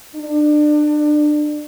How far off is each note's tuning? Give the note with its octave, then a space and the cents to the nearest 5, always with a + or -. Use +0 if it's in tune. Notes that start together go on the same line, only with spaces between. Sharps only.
D4 +30